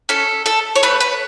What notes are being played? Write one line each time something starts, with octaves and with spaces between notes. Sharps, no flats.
C#4 A4
A4
C#5
A3 B4
B4